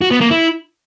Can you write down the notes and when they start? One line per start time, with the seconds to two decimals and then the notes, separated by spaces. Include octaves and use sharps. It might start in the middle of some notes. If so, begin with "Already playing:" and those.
0.01 F#4
0.11 B3
0.21 A#3
0.30 E4